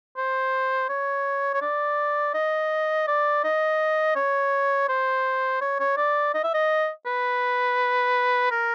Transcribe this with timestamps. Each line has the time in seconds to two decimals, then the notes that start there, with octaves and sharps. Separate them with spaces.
0.17 C5
0.89 C#5
1.54 C#5
1.62 D5
2.34 D#5
3.08 D5
3.44 D#5
4.16 C#5
4.89 C5
5.61 C#5
5.80 C#5
5.97 D5
6.34 D#5
6.44 E5
6.54 D#5
7.06 B4
8.51 A#4